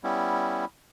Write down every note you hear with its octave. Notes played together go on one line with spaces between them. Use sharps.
G3 B3 C#4 E4